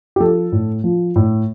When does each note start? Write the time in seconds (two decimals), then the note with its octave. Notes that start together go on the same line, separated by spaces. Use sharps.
0.16 G4
0.20 F3 A4
0.52 A2
0.84 F3
1.16 A2